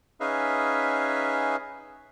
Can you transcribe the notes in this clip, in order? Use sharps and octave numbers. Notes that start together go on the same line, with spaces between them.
C#4 D#4 G#4 B4 E5 F5